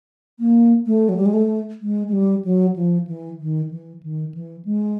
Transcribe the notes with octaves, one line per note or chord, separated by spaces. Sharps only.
A#3
A3
F#3
G3
G#3
A3
G#3
G#3
G3
F#3
F3
E3
D#3
E3
D#3
E3
G#3